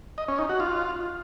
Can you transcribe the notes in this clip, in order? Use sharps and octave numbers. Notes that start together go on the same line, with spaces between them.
D#5
C#4
D#4
F#4
F4